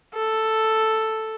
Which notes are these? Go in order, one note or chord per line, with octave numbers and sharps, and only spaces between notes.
A4